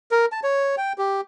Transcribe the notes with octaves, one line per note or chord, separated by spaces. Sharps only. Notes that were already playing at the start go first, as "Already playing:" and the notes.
A#4
A5
C#5
G5
G4